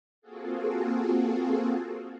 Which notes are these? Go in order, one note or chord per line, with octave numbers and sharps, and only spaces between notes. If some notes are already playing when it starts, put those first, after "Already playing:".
A#3 C4 F4 F#4 G#4 A4